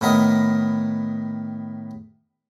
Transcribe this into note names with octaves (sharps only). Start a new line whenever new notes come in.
A2 D#3 B3 A#4 D#5